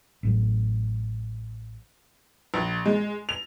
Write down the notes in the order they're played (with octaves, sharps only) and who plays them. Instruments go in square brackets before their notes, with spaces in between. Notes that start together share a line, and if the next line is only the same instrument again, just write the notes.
[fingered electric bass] A1 A2 F#3
[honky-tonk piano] A#1
G#3
F7